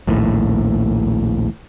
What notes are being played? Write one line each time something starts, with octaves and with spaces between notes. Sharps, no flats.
A#1 D#2 A2